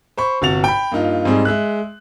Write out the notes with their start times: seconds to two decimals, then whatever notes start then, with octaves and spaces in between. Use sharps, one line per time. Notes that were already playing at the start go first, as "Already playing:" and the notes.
0.17 C5 B5 C#6
0.42 G1 C3 F#4 F#5 A6 F7
0.64 G5 B5
0.92 G2 A#3 D#4 F4
1.25 G#2 G3 C4 D#4 G#4
1.45 G#3 E5 F#6